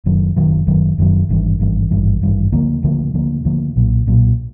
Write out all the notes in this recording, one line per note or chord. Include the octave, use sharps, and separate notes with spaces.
F#1 F#2 D#3 F#3
F#1 F#2 D#3 F#3
F#1 F#2 D#3 F#3
F#1 F#2 D#3 F#3
G#1 G2 E3
G#1 G2 E3
G#1 G2 E3
G#1 G2 E3
D2 D3 F3 A#3
D2 D3 F3 A#3
D2 D3 F3 A#3
D2 D3 F3 A#3
B1 A#2 F#3
B1 A#2 F#3